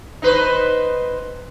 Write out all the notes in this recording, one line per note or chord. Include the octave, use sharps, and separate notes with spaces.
D#4 B4 C5